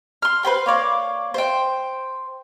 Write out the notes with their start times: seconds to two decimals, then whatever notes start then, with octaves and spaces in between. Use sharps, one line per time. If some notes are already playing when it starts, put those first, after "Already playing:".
0.22 C6 F6
0.43 B4 C5 G5 C6
0.66 A#3 C#5 D5
1.34 C5 G5